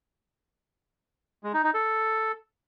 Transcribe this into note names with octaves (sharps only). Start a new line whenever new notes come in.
G#3
D#4
D#4
A4